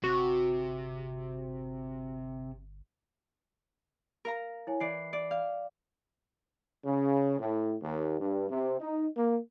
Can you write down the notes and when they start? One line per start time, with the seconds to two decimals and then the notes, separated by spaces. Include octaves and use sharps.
0.04 G1 C3 F#4
4.25 A#4 F5 A#5
4.67 E4 C#5 G#5
4.80 E3 D5 C7
5.13 D5
5.31 D5 F5
6.84 C#3
7.40 A2
7.82 D#2
8.20 G2
8.50 C3
8.79 D#4
9.16 A#3